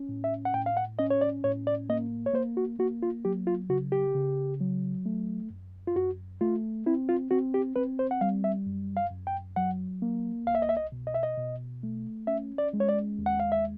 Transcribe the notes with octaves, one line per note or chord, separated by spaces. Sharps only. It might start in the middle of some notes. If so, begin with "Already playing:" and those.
Already playing: C#4
A2
E5
F#5
A2 G5
F5
F#5
C#4 D#5
C#5
D5
A2 C#5
D5
A#3 D#5
C#5
A#3 C5
F#4
A#3 F#4
F4
F#3 G4
F4
C#3 F#4
G4
C#3
F#3
A3
F#2
F4
F#2 F#4
A3 F4
C4 E4
F4
C4 F#4
G4
C4 B4
C5
F#5
G3 F5
E5
F#2
F5
F#2
G5
F#3 F#5
A#3
C2 F5
E5
D#5
E5
D#5
B2
D#5
E5
D#5
B2
A3
C#4 E5
D5
G#3
C#5
D5
D#2
F#5
F5
E5